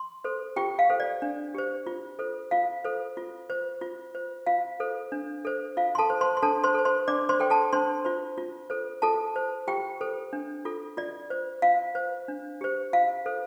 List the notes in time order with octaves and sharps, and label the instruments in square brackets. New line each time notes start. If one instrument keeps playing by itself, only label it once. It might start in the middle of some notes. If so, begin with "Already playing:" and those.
Already playing: [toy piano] C6
A4 C5
F4 G4 G5
F5
A4 C5
D5
D4
G4 C5
F4
A4 C5
F4 F5
A4 C5
F4
C5
F4
C5
F4 F5
A4 C5
D4
A4 C5
F4 F5
C6
A4 A5
C5
C5 C6
C6
D4 A4 A5
C5 C6
A4 C5
C5 C6
D4 D5 D6
C5 C6
A4 C5 G5
A4 A5
D4 C5 C6
F4 C5
F4
A4 C5
F4 A4 A5
C5
F4 G4 G5
A4 C5
D4
F4 A4
F4 D5
C5
F4 F5
C5
D4
G4 C5
F4 F5
A4 C5